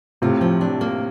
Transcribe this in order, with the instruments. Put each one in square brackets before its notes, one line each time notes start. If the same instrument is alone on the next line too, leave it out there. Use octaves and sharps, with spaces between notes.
[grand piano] A2 C3 [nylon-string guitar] F4
[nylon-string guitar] F3
D4
A#3